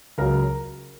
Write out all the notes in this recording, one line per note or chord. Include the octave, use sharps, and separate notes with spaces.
C#2 C#3 F#3 A#4